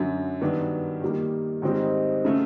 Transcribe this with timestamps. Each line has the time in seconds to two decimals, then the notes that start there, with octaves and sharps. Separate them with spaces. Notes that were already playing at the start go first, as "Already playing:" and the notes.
Already playing: F#2 D3 F#3
0.41 G2 D#3 F#3 B3 D4
1.02 D#3 G3 A#3
1.62 G#2 D#3 G3 C4 D#4
2.25 C#3 F#3 A3